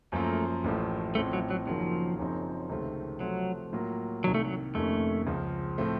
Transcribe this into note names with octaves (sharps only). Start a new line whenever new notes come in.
F#2 F3 A3 A#3 F4 A#4
A1 A2 F3 A3
A1 A2 F3 A3 C4
F#3
F#3
F#1 F#2 D#3 F3 F#3 A#3
F#1 F#2 F3 C4 D#4
C#2 C3 D#3 A3 C4
C3 F3 F#3 A3 C4
A2 F#3 A#3 F4
C2 C3 D#3 F#3
A3
F#3
F2 C3 D#3 A3 A#3 C#4
C#2 C#3 F3
A2 F3 A3 C4